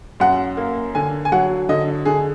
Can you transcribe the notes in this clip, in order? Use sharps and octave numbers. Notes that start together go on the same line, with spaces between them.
F#2 F#5
A#3
D3 G#5
G#5
F#3 F#5
D3 D#5
D3 G#4